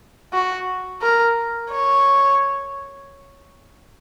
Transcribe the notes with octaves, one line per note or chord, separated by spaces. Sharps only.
F#4
A#4
C#5